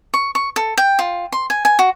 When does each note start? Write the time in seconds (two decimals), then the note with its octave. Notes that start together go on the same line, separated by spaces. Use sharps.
0.14 C#6
0.35 C#6
0.56 A4
0.78 G5
0.99 F4
1.32 C6
1.50 G#5
1.65 G#5
1.79 F#4